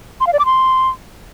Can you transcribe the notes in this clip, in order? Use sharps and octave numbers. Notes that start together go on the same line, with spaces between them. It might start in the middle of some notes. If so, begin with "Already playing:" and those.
C6
F5
D5
D6
C6